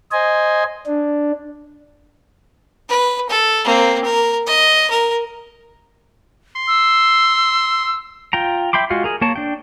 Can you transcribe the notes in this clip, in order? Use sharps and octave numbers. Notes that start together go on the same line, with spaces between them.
C5 D#5 G#5
D4
B4
A4
A#3 C4
A#4
D#5
A#4
C6
E6
F4 G5 A#5
E5 G5 B5 C6 D6
G#3 F4 F#4 F5
G#4 A#4
A#3 A#4 C#5 A5
D4 G5